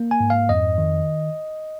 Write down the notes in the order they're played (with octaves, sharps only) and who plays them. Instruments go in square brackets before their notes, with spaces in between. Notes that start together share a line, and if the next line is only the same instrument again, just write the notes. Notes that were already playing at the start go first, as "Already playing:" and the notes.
Already playing: [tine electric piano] A#3
G#5
G#2
F5
F2 D#5
D#3